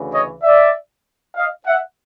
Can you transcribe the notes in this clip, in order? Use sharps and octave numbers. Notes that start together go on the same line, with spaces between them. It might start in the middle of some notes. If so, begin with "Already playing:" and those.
Already playing: D2 C#3 E3
C#5 D#5
D5 E5
D#5 F5
E5 F#5